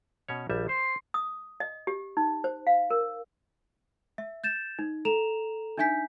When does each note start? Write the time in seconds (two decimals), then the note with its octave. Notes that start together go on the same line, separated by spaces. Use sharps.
0.28 B2 C#4 C#5
0.49 A#1 G3 E5
0.69 C5 C6
1.14 D#6
1.60 D#5
1.87 G4
2.17 D#4
2.44 C5
2.67 F5
2.91 A#4
4.18 E5
4.44 G6 A6 E7
4.79 D#4
5.05 A4 A#5 E7 F7
5.78 D4 D#4 E5 G#5 G6 B6